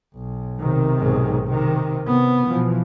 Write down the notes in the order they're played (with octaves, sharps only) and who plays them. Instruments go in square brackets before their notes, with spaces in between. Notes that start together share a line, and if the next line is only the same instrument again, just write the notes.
[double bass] B1
[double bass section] C3 D#3
[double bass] B1 G#2
[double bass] C3 [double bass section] D#3
[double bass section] C3 [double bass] B3
[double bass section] B2 E3 F3